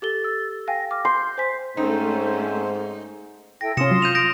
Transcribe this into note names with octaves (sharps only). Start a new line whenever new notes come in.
G4 A4 A6 G7
E6
F5 G5 G#5 A#6
D6 F6
C6 G6
C5 G#5 B6
G#2 A3 C4 C#4 D#4 C5
E4 A4 G5 A#6
C3 C#4 F4 C6 D#6 A#6 C#7 E7
F#3
G6 D#7 F7
G6 A#6 D7